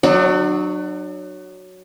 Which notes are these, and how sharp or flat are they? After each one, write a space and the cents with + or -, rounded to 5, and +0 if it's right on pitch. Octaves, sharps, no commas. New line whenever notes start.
F#3 +0 D4 +40 F#5 +30